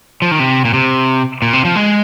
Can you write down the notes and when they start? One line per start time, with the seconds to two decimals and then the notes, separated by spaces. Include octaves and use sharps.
0.22 F3
0.31 D#3
0.40 C3
0.65 A#2
0.74 C3
1.42 A#2
1.53 C3
1.65 F3
1.76 G#3